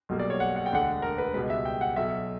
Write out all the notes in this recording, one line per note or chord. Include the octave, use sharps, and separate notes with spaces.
B1 B2 G3 A#3
D5
C#5
F#5
F#5
G5
E1 D2 D3 F#5
A#4
B4
C#2 B2 G3 B4
E5
G5
F#5
B1 B2 F#3 E5